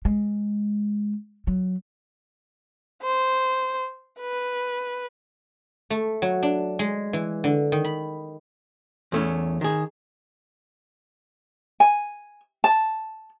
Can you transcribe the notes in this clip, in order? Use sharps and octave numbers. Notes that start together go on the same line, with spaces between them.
G#3
F#3
C5
B4
A3
F#3
D4
G#3
E3
D3
D#3
B5
E2 A3 C#4
D#3 G#4
G#5
A5